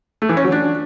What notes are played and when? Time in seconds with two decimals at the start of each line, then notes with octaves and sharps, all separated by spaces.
0.22 A3
0.29 E3
0.37 C#4
0.45 F#3
0.52 D4